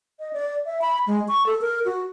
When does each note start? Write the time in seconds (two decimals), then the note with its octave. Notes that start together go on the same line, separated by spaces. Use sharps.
0.20 D#5
0.33 D5
0.66 E5
0.81 B5
1.07 G#3
1.28 C#6
1.46 A4
1.61 A#4
1.85 F#4